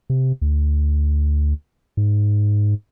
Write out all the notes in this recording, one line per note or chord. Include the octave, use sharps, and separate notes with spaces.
C3
D2
G#2